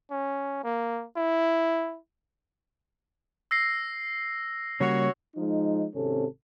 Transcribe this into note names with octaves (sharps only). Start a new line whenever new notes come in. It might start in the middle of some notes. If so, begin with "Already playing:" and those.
C#4
A#3
E4
E6 A#6 C7
C#3 G3 A#3 F#4 C#5
F3 G#3 D#4
G#1 C3 C#4 A4